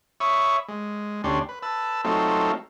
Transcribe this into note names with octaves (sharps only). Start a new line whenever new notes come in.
C#5 E5 B5 C#6 D#6
G#3
D2 C#4 D4 G4 C6
B4
B4 A5 E6
F#3 A3 C4 D#4 F4 A4